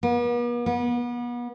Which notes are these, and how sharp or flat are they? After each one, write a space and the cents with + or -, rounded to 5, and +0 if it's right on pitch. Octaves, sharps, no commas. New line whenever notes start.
B3 -45
B3 -35